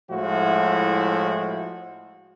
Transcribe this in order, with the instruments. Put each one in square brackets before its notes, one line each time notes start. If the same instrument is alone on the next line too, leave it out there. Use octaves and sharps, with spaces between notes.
[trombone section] A2 F3 G#3 E4 F#4